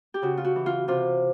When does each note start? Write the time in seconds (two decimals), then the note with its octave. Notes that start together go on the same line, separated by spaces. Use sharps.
0.14 G4
0.22 C#3 F#4
0.37 F4
0.44 F#4
0.56 E3
0.66 F4
0.88 C3 F4